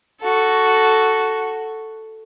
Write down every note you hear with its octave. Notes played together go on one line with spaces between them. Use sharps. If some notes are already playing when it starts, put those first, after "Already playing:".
F#4 A4